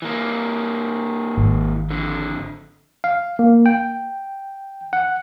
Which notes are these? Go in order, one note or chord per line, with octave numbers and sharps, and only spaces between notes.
E3 A#3
G#1
F2 D3
F5
A#3
G5
F#5